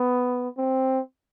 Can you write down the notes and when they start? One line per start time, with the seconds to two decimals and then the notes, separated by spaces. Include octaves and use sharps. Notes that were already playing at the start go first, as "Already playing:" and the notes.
Already playing: B3
0.57 C4